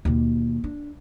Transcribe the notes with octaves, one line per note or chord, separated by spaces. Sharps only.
D#2 B2
D4